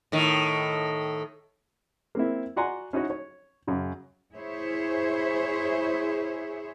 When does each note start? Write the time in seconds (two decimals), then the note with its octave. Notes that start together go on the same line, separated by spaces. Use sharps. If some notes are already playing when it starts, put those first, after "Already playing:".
0.12 A2 D#3
2.15 A#3 C4 E4
2.56 F#4 D5 F#5 G#5 A#5 C6
2.93 C#4 D#4 E4 F#4 C#5 D#5
3.10 C#5
3.67 F#2 C#3
4.35 E4 G#4 C5 C#5 E5